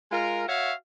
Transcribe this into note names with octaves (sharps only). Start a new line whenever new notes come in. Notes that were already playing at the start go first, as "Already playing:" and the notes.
G#3 F4 A#4
F#4 C#5 E5 F5